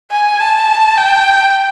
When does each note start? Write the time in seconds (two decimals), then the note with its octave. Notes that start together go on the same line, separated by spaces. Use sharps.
0.11 G#5
0.40 A5
0.97 G5